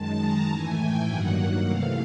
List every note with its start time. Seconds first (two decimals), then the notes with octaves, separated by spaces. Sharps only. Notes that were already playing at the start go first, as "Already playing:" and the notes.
Already playing: F#2 D#3 G#3 A5
0.20 A#5
0.49 A2 E3 A3 G#5
0.79 G5
1.07 G2 D#3 F#3 A#3 F#5
1.66 C3 E3 A3 F5